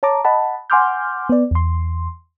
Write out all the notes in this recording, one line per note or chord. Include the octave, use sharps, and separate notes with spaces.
C#5 A5 A#5 D6
D#5 F#5 A5 B5
F#5 G#5 C6 D6 F6 G6
B3 D5
E2 C6